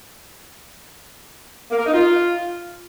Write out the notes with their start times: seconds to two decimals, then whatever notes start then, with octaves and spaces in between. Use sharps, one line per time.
1.71 A#3
1.79 A#4
1.86 D#4
1.94 F4